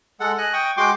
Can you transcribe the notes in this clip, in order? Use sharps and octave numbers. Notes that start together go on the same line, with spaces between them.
G#3 A4 F#5
D#5 G#5 F#6
G5 C#6 D#6
G#3 F#4 G5 C6 D6